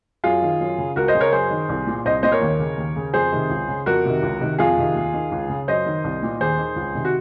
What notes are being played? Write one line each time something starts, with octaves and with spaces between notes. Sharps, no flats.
F#2 F4 G#4
D#3
F#2
C#3
C#2 F#4 A#4
C5 D#5
C#3
A#4 C#5
F#2 G#4 C5
D#3
C2
A#2
C2 C5 D#5
A#2 C5 D#5
A#4 C#5
D#2
C#3
D#2
C#3
F2 G#4 C5
C3 D#3
C#2
C#3
F2 F#4 A#4
C3 D#3
C#2
C3 D#3
F2 F4 G#4
C3 D#3
D#2
D#3
C#2
C#3
F#2 C5 D#5
D#3
C2
A#2
D#2 G#4 C5
D#3
C#2
C3 D#3
F#4